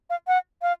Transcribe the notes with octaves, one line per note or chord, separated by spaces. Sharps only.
F5
F#5
F5